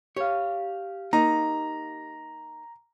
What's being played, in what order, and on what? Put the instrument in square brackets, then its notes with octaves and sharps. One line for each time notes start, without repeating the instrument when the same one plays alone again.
[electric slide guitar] G4 F5 [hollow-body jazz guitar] C#5
[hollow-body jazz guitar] A#3 D#4 [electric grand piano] A#5